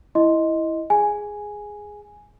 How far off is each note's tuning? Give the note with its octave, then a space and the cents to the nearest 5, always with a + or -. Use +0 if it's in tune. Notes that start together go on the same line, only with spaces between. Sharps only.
E4 +0 D#5 +10 C6 +0
G#4 +0 G#5 +0